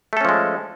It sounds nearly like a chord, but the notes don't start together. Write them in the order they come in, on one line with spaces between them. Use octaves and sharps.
A3 A4 C#4 F3 G#3